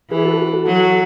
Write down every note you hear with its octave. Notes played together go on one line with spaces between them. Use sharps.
E3 G#4 B4
F#4 A4
F#4
F#4 A4
F#3